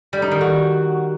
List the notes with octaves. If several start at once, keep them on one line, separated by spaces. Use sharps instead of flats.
G3
D#4
D#3
F#4